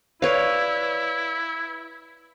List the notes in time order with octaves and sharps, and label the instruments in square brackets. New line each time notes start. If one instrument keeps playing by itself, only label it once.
[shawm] E4 [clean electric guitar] B4 D5 [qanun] C#5 F5